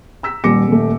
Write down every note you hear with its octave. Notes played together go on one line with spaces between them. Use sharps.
A#5 E6 B6
D#1 G3 D6 A#6 C#7
D#1 A3